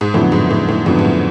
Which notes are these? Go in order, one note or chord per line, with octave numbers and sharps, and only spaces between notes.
G#2
F2 A2 D3 F#3 B3
G#2
A2
A2
F2 G#2 D3 F#3 B3
G#2
A2